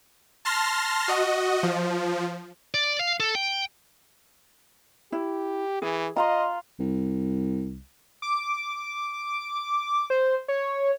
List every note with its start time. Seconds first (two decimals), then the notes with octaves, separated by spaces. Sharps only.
0.45 A5 C6 F6 A#6
1.08 F#4 D#5
1.63 F3
2.74 D5
2.99 F5
3.20 A4
3.35 G5
5.12 E4 G4
5.82 E3 G#4
6.16 F4 D#5 F5 A#5 C6
6.79 C2
8.22 D6
10.10 C5
10.48 C#5